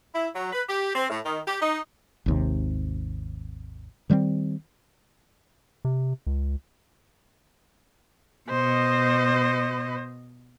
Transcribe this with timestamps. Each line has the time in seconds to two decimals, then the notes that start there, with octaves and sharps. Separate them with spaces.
0.15 E4
0.35 F#3
0.53 B4
0.69 G4
0.95 C4
1.10 A2
1.25 D#3
1.48 G4
1.62 D#4
2.26 G#1 D#2 C3
4.10 D#3 G3 A3 C4
5.85 C3
6.27 C#2
8.50 B2 C5 D#5